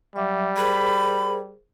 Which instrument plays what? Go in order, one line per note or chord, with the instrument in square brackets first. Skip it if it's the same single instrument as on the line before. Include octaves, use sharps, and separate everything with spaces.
[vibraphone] F#3 E5 D6 [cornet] G3
[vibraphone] G#4 A#4 C5 [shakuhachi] B5